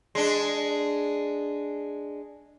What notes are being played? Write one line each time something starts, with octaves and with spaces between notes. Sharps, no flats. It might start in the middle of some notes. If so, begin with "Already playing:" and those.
G#3 D4